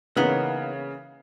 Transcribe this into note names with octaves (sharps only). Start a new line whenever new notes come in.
C#3 E3 A#3 B3 C#4 D#4